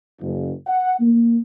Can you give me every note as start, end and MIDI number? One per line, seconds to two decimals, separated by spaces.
0.21 0.50 30
0.67 0.96 78
1.00 1.40 58